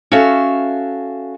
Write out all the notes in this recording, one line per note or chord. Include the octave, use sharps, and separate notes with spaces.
C#4 F#4 A4 E5 F5